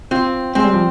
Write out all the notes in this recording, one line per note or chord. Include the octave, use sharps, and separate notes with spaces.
C4 F4
G#3 C4
G3
F3